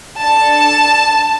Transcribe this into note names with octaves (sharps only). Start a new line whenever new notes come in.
D4 A4 A5